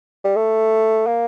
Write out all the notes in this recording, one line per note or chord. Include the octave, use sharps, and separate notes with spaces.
G3
A3
A#3